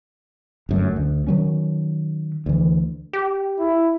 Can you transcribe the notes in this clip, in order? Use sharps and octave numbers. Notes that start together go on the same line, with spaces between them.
G1 F#2 A3
D2
D#3 F#3 C#4
D2 E3
G4
E4